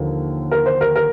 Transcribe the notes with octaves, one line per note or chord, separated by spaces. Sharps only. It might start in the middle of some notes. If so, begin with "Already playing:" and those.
Already playing: D#2 D3 F3
A#4
C5
A#4
A#4